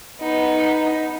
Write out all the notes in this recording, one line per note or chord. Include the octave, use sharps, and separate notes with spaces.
B3 D#4